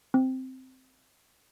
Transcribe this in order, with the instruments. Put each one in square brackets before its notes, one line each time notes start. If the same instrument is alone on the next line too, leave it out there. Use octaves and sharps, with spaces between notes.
[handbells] C4